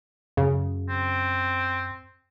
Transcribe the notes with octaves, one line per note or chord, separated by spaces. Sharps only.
F#2 C#3
C4